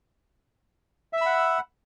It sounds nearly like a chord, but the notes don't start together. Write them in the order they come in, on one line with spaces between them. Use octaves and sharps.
E5 E6 B5 F#5